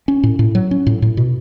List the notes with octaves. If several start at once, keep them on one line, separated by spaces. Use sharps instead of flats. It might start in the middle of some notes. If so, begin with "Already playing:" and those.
C#4
A2
A2
F#3
C#4
A2
A2
B2